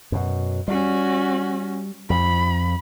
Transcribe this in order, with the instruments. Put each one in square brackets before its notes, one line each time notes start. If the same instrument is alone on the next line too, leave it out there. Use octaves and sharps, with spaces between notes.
[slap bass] F#2 B2
[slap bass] G3 [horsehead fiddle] C#4 F#4
[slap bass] F2 F3 [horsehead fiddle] B5